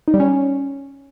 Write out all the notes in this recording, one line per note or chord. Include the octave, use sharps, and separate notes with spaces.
D#4
G3
C#4